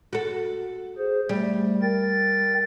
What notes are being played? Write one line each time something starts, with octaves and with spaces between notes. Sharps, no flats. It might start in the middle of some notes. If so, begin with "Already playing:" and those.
F#4 A4
G#4 C5
G3 A3
A#4 G5 A6